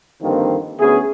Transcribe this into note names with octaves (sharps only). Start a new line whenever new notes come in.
G2 D3 D#3 F3 A#3 C4
D2 B3 C#4 E4 G#4